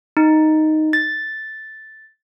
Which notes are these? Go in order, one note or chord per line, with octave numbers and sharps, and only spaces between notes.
D#4
A6